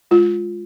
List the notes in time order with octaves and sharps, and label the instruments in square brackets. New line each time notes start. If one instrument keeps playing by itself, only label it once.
[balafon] G#3 F4